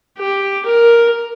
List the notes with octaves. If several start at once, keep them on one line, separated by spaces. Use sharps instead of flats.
G4
A#4